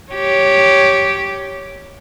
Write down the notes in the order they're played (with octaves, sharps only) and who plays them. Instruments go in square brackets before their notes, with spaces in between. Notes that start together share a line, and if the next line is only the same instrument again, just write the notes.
[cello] G4 C#5